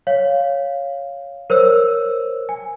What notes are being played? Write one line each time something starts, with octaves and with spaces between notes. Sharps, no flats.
C#5 F5
A#4 C5 C#5 E6
G#5